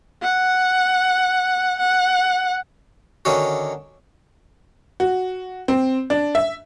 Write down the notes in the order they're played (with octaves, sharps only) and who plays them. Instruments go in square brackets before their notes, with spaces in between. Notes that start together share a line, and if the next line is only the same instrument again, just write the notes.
[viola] F#5
F#5
[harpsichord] D3 D#3 C#4 F#4
[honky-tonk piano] F#4
C4
D4
E5